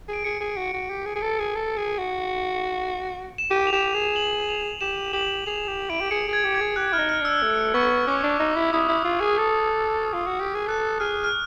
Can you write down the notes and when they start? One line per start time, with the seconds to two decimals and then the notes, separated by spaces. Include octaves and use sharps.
0.08 G#4 D7
0.24 G#4 C#7
0.41 G#4
0.57 F#4
0.73 F#4
0.90 G4
1.06 G#4
1.16 G#4
1.22 A4
1.39 G#4
1.56 A4
1.77 G#4
1.98 F#4
3.38 E7
3.51 G4 D#7
3.67 F7
3.73 G4 E7
3.93 G#4 F7
4.16 F#7
4.49 F7
4.81 G4 E7
5.13 G4 F#7
5.46 G#4 F7
5.68 G4
5.90 E4 D7
6.01 G4
6.11 G#4 C#7
6.28 G#4
6.33 G#6
6.44 G4
6.55 G#6
6.61 G#4
6.76 G4 F#6
6.93 E4 F6
6.99 D#4
7.09 F6
7.21 D4 E6
7.42 A3
7.74 B3 C#6
8.08 C#4 D6
8.24 D4
8.29 C#6
8.40 D#4
8.51 D6
8.55 E4
8.73 E4 D#6
8.88 E4
9.05 F4
9.21 G#4
9.38 A4
10.14 F4
10.27 F#4
10.40 G4
10.55 G#4
10.67 A4 F#6
11.00 G#4 F6
11.24 F6